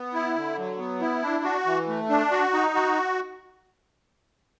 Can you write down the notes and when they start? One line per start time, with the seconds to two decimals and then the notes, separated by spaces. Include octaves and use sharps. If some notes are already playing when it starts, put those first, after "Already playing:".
Already playing: B3
0.13 E4
0.36 D3
0.58 F#3
0.79 B3
1.01 E4
1.23 D4
1.44 F#4
1.66 E3
1.88 A3
2.09 D4
2.31 F#4
2.53 D#4
2.75 F#4